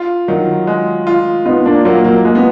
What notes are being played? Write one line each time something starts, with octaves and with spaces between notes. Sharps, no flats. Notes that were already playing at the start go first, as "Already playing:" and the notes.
Already playing: F4
D#3 F#3
G#3
F4
B3 D#4 F4
A#3 D4
F#3 A#3 F4
F#3 A#3
G#3 A#3
B3